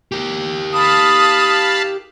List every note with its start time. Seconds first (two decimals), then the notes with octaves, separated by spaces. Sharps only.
0.12 G4 A#4
0.73 F5 A5 B5 D#6